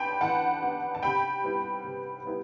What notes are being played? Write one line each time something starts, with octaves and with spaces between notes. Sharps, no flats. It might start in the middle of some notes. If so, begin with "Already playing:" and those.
Already playing: B3 D4 G5 A5 B5 C6
E3 F#5 A5
B3 D4
A5
C3 G5 B5
G3 B3 E4
C3
G3 B3 E4